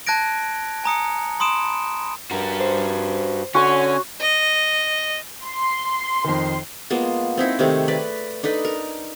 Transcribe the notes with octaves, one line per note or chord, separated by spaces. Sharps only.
A5 F#6 G#6 A#6 D7
G#5 A#5 D#6 C#7
B5 C6 D#6 D7 E7
G2 F#4 A#4
C5
D3 C#4 F#4 C#5 G#5 C6
D#5
C6
F2 D#3
G#3 A#3 B3 F4
C4 D#4 E4
C3 D#3 A3 G#4
B4 D5
D4 D#4 A4 B4
A#4